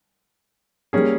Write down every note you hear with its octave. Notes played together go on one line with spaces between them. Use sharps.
G3 A#3 C#4 G#4